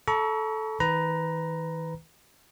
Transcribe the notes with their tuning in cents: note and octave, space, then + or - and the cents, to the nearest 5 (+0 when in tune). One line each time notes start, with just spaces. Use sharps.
A4 -10 A#5 +40 C#6 +30
D#3 +45 B4 +20 A#5 +10